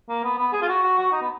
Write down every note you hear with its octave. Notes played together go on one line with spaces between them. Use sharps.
A#3
B3
B3
G#4
F4
F#4
F#4
F#4
D#4
B3